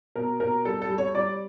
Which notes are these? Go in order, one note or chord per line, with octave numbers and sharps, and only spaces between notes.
B2 A#4
B2 A#4
G3 A4
A4
G3
C#5
G3 D5